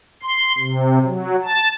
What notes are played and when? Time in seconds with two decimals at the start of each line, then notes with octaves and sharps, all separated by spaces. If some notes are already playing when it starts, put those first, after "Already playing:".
0.23 C6
0.58 C3
1.04 F#3
1.44 A5